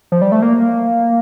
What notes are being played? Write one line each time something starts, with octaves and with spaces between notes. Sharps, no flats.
F3
G3
A3
A#3